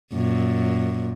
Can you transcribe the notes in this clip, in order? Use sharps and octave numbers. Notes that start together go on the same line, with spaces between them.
F#2 A#2